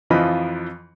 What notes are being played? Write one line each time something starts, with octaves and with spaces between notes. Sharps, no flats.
F2 E3 F3 F4 D#5 B5